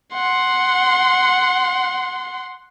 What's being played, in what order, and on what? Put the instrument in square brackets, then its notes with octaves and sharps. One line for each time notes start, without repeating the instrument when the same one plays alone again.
[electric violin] F#5 C6